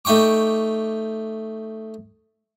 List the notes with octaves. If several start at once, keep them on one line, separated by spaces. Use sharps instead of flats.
A3 D#4 G5 C#6 D6